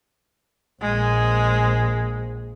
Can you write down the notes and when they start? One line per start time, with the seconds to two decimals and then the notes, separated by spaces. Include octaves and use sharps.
0.81 A#1 G#3